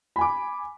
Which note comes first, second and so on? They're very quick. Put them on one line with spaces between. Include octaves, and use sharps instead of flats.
B5 G#5 D6